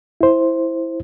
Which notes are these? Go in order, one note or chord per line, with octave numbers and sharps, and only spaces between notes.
E4 C5